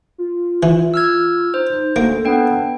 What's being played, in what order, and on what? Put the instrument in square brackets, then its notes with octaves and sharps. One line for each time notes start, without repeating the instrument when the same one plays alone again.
[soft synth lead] F4
[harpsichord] E3
[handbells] E6 F6 G#6
[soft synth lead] D#4 [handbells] C5
[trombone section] D2 [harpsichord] A#3 [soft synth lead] A4
[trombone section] B3 [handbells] D4 G5